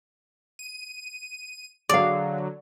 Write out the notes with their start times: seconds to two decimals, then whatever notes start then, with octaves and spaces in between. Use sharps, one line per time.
0.59 D#7
1.89 D3 F#3 G#4 D5 F5